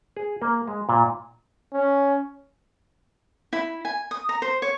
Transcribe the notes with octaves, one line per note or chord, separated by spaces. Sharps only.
G#4
A#3
G#3
A#2
C#4
E4
G#5
D#6
A#5
C5
C#5